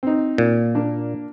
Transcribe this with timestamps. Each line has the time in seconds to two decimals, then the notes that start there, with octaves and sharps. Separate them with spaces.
0.03 C4 D#4
0.38 A#2
0.75 A#3 D4